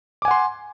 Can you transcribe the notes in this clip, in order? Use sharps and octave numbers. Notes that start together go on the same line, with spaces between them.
F#5 G#5 C6 D6